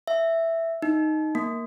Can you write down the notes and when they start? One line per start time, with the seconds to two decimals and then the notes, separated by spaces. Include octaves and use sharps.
0.08 E5
0.82 D#4
1.35 A#3